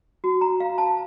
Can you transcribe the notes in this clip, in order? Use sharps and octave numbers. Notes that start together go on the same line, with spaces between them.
F#4
A#5
F5
A5